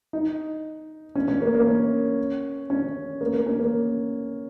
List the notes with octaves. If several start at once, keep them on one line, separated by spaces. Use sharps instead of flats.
D#4
C#4
C#4
A#3
A#3
C#4
C#4
A#3
A#3
C#4
A#3